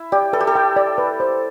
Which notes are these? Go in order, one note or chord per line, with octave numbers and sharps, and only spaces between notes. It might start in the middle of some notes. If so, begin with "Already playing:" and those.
Already playing: E4
G4 D5
A4 B4
G4
A4
G5
D5
B4
C5